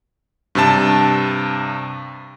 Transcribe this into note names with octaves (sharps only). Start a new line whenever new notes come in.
G2 C3 A5